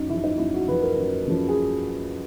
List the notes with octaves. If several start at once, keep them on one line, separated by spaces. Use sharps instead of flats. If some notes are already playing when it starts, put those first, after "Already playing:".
Already playing: F#2 D#4
C#3 F3 E4
D#4
F#2 E4
F#4
C#3 F3 B4
A#4
F#2
C#3 F3
G#4